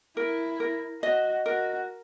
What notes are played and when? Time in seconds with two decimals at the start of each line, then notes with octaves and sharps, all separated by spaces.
0.17 E4 A#4
0.60 A#4
1.02 F#4 D#5
1.46 F#4 A#4